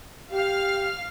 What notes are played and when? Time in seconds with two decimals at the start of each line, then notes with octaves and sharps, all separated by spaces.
0.31 G4 F5 F6